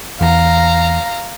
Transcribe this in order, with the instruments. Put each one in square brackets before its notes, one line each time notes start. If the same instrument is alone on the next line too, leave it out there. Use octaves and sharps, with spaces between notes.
[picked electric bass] E2 [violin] F5 A#5